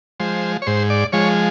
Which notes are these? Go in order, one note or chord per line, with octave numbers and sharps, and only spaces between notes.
F3 G#3 C5
C#5
G#2 C5
D5
F3 G#3 C#5